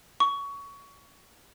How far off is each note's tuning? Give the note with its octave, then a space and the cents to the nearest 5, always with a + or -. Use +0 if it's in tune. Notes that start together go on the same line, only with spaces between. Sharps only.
C#6 +20